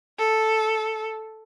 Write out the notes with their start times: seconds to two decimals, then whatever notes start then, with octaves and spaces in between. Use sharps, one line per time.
0.18 A4